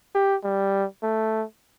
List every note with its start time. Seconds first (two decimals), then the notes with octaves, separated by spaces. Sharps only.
0.15 G4
0.44 G3
1.03 A3